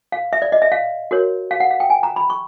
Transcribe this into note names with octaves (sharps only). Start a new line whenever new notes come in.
F5
E5
D5
D#5
E5
F5
F#4 A#4 C#5
F5
F#5
F5
G5
G#5
A#5
B5
C#6